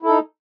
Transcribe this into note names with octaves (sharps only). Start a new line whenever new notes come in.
D#4 E4 A4